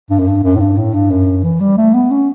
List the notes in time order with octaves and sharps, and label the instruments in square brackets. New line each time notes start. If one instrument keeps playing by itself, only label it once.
[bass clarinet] G2
F#2
G2
F#2
A2
G2
A2
G2
F#2
E3
G3
A3
B3
C#4